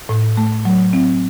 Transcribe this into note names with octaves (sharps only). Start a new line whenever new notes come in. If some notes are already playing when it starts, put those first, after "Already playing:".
A2
A3
F#3
C4